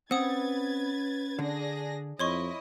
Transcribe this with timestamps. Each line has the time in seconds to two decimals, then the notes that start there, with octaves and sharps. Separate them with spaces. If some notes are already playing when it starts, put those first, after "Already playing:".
0.11 C4 C#4 B4 F#5 D#6 G#6 A6
1.39 D3 D4 G#4 A#6
2.19 F2 E4 C#5 D#5 C6 C#6